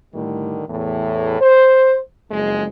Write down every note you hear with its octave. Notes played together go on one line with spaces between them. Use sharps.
A2 D3 D#3 G3
E2 A2
C5
F#1 F2 G#3